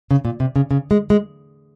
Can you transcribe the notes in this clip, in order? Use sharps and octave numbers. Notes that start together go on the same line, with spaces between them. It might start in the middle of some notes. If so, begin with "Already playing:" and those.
C#3
A#2
C3
C#3
C#3
G#3
G#3